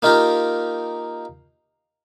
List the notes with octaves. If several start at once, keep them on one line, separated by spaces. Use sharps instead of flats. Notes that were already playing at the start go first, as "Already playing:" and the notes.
A#3 D#4 F4 G4 A#4